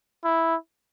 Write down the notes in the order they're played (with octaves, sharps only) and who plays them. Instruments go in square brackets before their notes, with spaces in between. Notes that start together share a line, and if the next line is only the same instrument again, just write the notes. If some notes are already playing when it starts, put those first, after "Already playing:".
[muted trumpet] E4